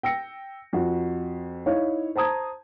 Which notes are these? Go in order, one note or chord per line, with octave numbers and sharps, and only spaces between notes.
G5 E6 A#6 C#7
F2 F#4
D#4 E4 C#5 F5
C5 A5 A#5 D#6 G#6